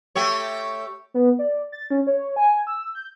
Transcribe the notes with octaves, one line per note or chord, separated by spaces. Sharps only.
A3 G4 C#5
B3
D5
A6
C#4
C#5
G#5
E6
G6